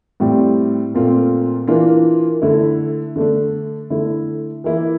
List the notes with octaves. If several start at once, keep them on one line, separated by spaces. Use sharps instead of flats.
A2 G3 C4
A#2 A3 C4 F4
E3 A#3 D4 F4
D3 A3 E4
D3 A3 D4
D3 A3 E4
E3 A#3 E4